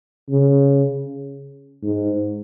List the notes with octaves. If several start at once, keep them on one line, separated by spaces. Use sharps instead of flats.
C#3
G#2